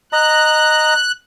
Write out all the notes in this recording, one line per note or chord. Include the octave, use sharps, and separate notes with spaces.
D#5 A#5 F#6